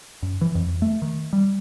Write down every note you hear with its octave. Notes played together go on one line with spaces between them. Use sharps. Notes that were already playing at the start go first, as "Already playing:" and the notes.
F#2
E3
F2
A3
D#3
G3